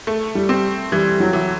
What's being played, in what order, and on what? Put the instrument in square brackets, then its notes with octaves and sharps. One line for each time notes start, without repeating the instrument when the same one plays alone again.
[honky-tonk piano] A3
[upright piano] G3
[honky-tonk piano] C4
[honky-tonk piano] E3 [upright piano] G3
[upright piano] F#3
[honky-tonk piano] E3